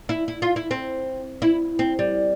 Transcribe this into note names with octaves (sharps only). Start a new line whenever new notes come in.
E4
E4
F4
E4
C4
E4
C4
G3